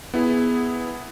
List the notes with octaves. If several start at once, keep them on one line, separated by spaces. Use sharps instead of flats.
B3 E4 G#4